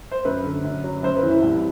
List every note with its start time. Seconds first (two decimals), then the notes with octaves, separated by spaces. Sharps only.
0.12 C5
0.25 F#2 B4
0.43 D3
0.64 F#2
0.84 F#3
1.03 F#2 C5
1.17 B4
1.23 E3
1.30 E4
1.43 C2